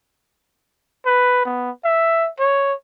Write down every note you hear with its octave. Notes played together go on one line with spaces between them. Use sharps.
B4
B3
E5
C#5